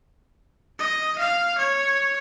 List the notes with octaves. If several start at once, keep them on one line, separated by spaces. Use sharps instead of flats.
D#5
F5
C#5